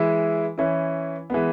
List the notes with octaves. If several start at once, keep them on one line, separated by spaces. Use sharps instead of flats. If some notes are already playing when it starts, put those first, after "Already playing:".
Already playing: E3 G#3 E4
E3 C#4 E4
E3 G#3 B3